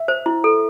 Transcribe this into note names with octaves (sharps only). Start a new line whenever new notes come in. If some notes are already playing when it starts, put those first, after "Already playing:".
Already playing: E5
C5
E4
A4